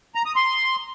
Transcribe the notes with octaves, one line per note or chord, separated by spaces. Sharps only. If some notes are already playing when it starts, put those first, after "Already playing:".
A#5
D#6
C6